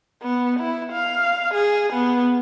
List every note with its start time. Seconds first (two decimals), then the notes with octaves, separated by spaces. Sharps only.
0.23 B3
0.60 E4
0.93 F5
1.54 G#4
1.93 B3